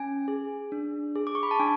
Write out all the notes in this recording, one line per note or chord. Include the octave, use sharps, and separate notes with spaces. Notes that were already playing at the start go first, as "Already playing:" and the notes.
Already playing: C#4 G#5
G#4
D4
G#4
D6
C#6
B5
A5
D4 G#5